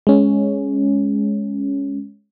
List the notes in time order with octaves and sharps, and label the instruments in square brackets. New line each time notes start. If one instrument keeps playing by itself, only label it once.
[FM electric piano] G#3 C#4